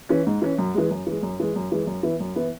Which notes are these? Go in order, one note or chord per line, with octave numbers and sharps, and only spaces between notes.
E3 C#4
G#2
E3 C#4
F#2
E3 G#3
F#2
E3 G#3
F#2
E3 G#3
F#2
E3 G#3
F#2
E3 B3 E4
F#2
E3 B3 E4